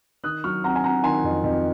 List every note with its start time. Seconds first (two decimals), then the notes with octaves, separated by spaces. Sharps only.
0.24 D#3 D#6 F#6
0.44 F#3 C#6 F6
0.64 C4 F#5 A#5
0.75 G#5
0.84 C4 F#5 A#5
1.04 D#3 G#5 C6
1.24 F2
1.44 F2